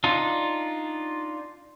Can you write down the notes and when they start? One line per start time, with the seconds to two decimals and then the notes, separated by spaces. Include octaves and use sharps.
0.04 D4 D#4 F4